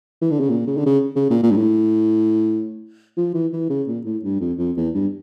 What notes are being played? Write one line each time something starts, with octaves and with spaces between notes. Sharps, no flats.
E3
D3
C#3
A#2
C#3
D3
C#3
C#3
A#2
A#2
G2
A2
F3
E3
E3
C#3
A#2
A2
G2
F2
F2
E2
G2